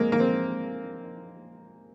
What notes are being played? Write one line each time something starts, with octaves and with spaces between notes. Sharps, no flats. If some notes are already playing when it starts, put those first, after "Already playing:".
Already playing: G#3 A#3 C4
A#3
C4